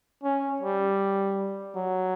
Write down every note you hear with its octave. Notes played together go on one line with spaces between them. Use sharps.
C#4
G3
F#3